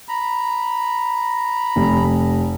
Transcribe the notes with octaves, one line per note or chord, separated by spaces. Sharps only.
A#5 B5
F1